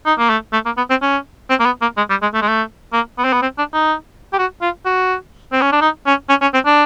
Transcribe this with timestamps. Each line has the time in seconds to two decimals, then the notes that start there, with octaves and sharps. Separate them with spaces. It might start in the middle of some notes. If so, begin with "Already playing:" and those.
0.06 D#4
0.19 A#3
0.30 A3
0.53 A3
0.66 A#3
0.77 B3
0.90 C4
1.02 C#4
1.50 C4
1.60 A#3
1.65 B3
1.81 A#3
1.97 G#3
2.10 G3
2.22 G#3
2.34 A3
2.42 G#3
2.48 A3
2.93 A#3
3.18 B3
3.25 C4
3.33 B3
3.42 C4
3.58 D4
3.74 D#4
4.33 G4
4.38 F#4
4.62 F4
4.86 F#4
5.52 C4
5.61 C#4
5.72 D4
5.81 D#4
6.07 C#4
6.29 C#4
6.42 C#4
6.54 C4
6.66 D4